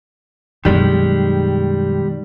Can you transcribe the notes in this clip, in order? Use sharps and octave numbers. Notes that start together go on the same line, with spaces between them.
F#2 B2 D#3 G3 G#3